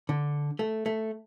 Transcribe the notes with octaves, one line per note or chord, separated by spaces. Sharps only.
D3
A3
A3